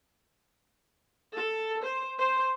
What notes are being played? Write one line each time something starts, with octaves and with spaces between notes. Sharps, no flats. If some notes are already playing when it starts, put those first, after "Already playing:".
A4
C5
C5